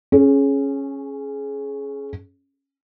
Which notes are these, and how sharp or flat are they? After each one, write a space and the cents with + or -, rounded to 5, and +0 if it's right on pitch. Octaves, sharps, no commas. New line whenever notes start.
C#4 -10 G#4 +20